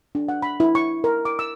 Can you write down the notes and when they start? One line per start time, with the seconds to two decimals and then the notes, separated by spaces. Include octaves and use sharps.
0.15 D4
0.29 F#5
0.42 B5
0.60 E4
0.75 C#6
1.04 A#4
1.25 D6
1.39 E6